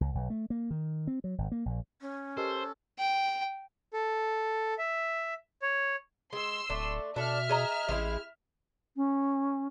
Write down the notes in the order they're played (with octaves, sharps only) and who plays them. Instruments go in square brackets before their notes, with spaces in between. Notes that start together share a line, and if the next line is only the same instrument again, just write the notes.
[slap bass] C#2
B1
A3
A#3
D#3
C4
F#3
G#1
A#3
A#1
[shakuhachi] C#4
[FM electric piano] G4 A#4 D#5 [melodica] A4 [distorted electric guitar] C5
[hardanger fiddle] G5
[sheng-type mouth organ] A4
E5
C#5
[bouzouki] G#3 [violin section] C6 E6
[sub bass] D1 [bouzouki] A3 D4
[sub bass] B2 [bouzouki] D4 A4 [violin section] E5 F6
[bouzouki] G#4 D#5 A#5
[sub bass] A1 [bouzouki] G#3 C4 E4
[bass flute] C#4